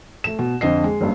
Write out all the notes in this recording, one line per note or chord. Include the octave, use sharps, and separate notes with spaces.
A3 E7
B2
F2 D3 D#5 C7
G#3
F#1 G2